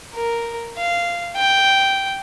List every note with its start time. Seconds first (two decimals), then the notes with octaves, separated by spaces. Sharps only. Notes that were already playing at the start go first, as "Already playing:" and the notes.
0.15 A#4
0.78 F5
1.37 G5